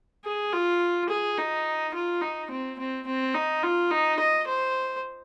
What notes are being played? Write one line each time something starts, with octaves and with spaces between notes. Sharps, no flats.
G#4
F4
G#4
D#4
F4
D#4
C4
C4
C4
D#4
F4
D#4
D#5
C5